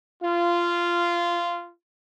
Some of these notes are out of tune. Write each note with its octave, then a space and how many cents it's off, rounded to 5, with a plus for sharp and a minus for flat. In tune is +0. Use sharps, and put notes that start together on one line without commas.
F4 -15